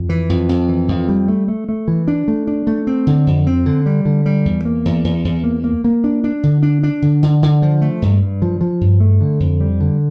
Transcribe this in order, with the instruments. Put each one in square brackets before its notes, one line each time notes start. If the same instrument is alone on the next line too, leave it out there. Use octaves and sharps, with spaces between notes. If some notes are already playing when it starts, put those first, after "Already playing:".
Already playing: [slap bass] F2
E3
F2
F2
E3
F2
G3
A3
A3
A3
E3
D4
A3
D4
A3
C4
D3
F2
C4
D3
G3
D3
G3
E2
A#3
E2
E2
E2
A#3
A#3
A#3
D4
D4
D3
D4
D4
D3
D3
D3
F3
A3
G2
G2
F3
F3
G2
A3
D3
F2
G3
D3